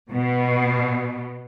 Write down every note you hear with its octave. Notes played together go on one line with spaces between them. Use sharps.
B2